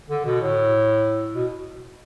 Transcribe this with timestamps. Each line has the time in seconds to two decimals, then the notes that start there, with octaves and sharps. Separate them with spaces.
0.09 D3
0.25 B2
0.41 A2
1.35 B2